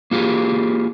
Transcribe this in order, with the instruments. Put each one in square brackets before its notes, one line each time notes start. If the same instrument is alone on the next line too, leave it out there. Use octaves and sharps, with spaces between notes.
[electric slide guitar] A#3 F4 G4 G#4